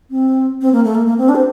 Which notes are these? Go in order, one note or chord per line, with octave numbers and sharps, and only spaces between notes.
C4
C4
A#3
A3
A#3
A#3
C4
D4
C5